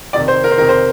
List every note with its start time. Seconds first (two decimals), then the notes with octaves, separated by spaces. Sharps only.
0.13 F2 C3 D#3 D5
0.28 C5
0.44 A#4
0.51 C5
0.58 F2 C3 D#3 A#4
0.69 C5